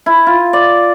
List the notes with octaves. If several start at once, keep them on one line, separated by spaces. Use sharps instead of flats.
E4
F4
D5